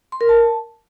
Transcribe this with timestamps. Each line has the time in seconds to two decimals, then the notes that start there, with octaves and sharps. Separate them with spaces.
0.12 C6
0.21 A#4
0.29 A5